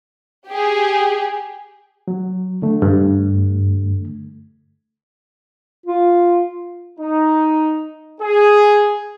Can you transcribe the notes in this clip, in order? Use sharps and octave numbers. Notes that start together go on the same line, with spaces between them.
G4 G#4
F#3
D3 A3
G2
F4
D#4
G#4